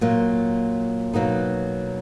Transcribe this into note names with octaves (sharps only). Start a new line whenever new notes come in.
A#2 F#3 A#3
B2 F#3 A#3 D#4